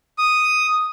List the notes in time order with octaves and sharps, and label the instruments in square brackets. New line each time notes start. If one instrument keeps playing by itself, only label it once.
[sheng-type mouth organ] D#6